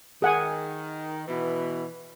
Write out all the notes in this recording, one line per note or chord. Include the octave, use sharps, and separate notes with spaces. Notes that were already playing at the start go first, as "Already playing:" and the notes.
D#3 G#4 F#5 G#5
B2 E3